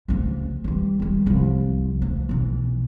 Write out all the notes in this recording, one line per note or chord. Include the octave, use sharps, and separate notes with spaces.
D2 C#3
E3 G3
D#3 G3
C2 F3
D2
B1 E3